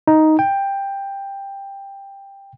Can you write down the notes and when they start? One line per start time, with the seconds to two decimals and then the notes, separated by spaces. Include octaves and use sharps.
0.08 D#4
0.39 G5